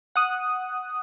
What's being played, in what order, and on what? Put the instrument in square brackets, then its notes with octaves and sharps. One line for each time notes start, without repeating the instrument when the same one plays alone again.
[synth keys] F#5 D#6